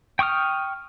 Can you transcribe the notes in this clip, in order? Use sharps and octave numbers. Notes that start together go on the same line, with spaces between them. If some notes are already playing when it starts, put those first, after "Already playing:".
G5 C#6 D#6 F6